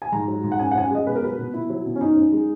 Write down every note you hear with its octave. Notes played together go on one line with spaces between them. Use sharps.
G#5
G#2 A#5
F#3
G#2
F#5
F#2 G#5
F#5
F#2 G#5
F#5
G#3 D#5
B2 B4
A#4
F#3 B4
B2
B2 E4
F#3
B2
C#4
F#2 D#4
F#2
G#3